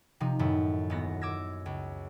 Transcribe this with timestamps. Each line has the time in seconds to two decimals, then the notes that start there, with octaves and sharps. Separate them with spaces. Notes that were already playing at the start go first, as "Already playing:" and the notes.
0.20 C3 F3 D#4
0.39 F#2 A2 D#3 E4
0.90 D#1 B3 A#6
1.21 D6 E6 G#6 A#6
1.66 C#2